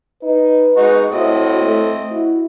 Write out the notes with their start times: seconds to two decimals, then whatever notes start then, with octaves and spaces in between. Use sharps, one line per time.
0.23 D#4 B4
0.76 G#3 D#4 F#4
1.11 A2 C4 F#4 D#5
1.62 A3
2.11 E4 F#4